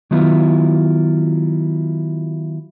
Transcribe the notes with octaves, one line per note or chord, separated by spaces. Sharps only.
D#3 F#3 B3 E4 F4